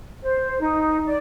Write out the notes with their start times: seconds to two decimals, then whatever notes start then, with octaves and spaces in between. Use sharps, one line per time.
0.23 C5
0.60 D#4
1.06 D5